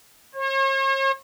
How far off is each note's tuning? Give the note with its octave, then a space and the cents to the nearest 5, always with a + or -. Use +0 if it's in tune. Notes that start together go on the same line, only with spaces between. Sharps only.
C#5 -45